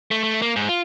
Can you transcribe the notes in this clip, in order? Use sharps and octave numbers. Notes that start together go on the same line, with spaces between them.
A3
A3
A#3
G#2
F4